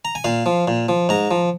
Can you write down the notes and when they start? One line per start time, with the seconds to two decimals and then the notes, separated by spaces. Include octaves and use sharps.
0.05 A#5
0.15 G#5
0.24 A#2 F5
0.46 F3
0.68 A#2
0.89 F3
1.09 G#2 A#5
1.31 F3